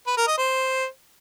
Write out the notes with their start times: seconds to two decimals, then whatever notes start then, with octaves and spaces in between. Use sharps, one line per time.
0.07 B4
0.17 A#4
0.28 D#5
0.38 C5